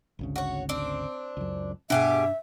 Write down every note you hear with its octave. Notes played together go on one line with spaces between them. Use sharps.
G#1 D2 C#3
F#4 C#5
C4 D4
C#2 F#2
G2 B2 D4 G4 G#4 E5